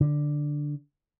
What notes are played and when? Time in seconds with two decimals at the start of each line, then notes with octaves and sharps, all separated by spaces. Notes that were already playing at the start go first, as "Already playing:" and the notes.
0.01 D3